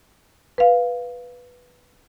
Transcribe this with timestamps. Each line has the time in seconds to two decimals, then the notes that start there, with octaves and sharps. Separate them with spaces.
0.58 B4 F5